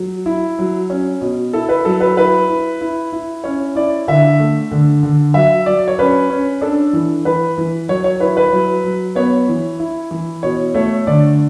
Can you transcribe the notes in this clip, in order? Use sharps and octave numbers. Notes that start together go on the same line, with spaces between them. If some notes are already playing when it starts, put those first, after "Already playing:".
Already playing: F#3
E4
F#3
C#4
B2
E4 A4
B4
F#3 A4
B4
E4 B4
E4
E4
E4
C#4 C#5
E4 D5
D3 E5
A3
D3
D3
F#3 E5
F#3 D5
C#5
C#4 B4
C#4
D4 A4
E3
E3 B4
E3
F#3 C#5
C#5
E4 B4
B4
F#3
F#3
B3 C#5
E3
E4
E3
B2 C#5
A3 C#5
D3 D5